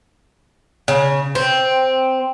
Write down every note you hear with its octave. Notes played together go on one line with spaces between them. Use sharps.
C#3
C4